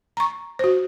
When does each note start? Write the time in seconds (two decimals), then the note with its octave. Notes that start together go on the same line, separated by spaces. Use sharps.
0.17 A#5 C#6
0.59 F#4 C5